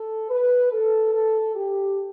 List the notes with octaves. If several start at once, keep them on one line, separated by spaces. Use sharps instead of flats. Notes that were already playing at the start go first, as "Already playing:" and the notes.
Already playing: A4
B4
A4
A4
G4